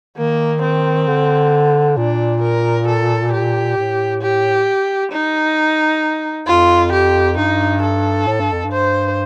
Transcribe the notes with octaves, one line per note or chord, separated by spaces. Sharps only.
D#3 A#3
C4
D3
A#2 D4
A#4
A4
G4
A2
G4
D#4
F2 F4
G4
G2 D#4
A4
A2
G2
F2
G2
C5